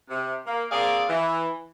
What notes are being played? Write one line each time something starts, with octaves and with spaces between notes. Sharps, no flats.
C3
A#3
A#3 C4 G#4 D5 F5
E3